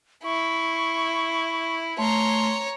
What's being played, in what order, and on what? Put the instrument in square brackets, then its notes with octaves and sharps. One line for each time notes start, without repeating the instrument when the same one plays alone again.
[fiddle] E4 [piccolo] C#6
[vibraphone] A3 [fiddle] C#5 A#5 [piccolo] C6